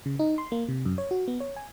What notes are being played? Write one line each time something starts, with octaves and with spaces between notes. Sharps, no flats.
C#3
D#4
C6
A#3
C3
F#2
C#5
F#4
B3
C#5
G#5